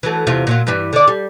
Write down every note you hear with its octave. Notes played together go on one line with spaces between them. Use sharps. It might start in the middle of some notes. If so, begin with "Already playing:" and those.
E3 F#3 A3
E2 C3 F4
A#2 F#3 F4
G2 E3 G3
D3 D5
G3